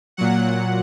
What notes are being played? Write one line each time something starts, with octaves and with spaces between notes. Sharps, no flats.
A#2 F#3 F#5